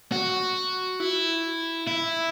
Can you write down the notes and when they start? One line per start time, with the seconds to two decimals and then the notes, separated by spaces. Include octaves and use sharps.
0.12 F#4
1.00 E4
1.87 E4